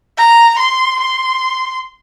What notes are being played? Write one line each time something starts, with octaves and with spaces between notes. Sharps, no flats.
A#5
C6
C6